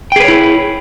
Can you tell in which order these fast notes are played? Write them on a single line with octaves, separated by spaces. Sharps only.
G5 G#4 B4 C#5 E4